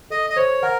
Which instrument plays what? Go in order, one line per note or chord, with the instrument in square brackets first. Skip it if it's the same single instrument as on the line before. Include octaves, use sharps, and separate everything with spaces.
[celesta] A4 [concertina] D#5
[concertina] D#5
[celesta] C5 [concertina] C#5
[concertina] A#4 [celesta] F#5